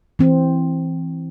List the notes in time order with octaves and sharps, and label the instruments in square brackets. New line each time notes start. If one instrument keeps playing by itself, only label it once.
[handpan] E3 C4